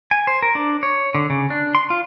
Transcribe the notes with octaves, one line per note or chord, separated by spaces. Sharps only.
G#5
C5
A#4
D4
C#5
D3
C#3
D4
C6
F4